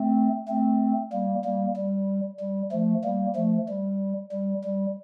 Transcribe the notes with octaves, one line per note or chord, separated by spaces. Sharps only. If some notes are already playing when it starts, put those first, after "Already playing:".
Already playing: A3 C4
A3 C4
G3 A#3
G3 A#3
G3
G3
F3 A3
G3 A#3
F3 A3
G3
G3
G3